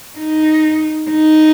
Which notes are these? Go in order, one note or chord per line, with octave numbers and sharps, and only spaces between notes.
D#4
D#4